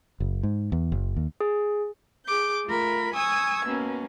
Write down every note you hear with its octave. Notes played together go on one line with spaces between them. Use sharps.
F#1
G#2
E2
F#1
D#2
G#4
G#4 D6 G6
A3 F4 A#4 B5
G#5 C#6 D#6 E6 G#6
B2 A#3 C#4